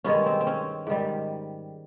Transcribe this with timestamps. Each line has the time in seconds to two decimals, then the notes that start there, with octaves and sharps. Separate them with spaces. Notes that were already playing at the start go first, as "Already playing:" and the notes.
0.04 G2 D#3 G#3 C#4
0.26 C4
0.41 C4
0.47 C#4
0.87 G#2 D#3 G3